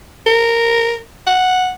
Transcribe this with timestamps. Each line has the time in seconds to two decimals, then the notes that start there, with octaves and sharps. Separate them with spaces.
0.26 A#4
1.27 F#5